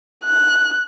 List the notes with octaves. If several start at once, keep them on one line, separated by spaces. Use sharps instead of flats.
F#6